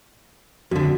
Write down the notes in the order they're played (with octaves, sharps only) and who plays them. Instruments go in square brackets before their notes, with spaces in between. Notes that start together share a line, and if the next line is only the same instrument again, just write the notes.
[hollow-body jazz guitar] F2 D3 [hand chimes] F#4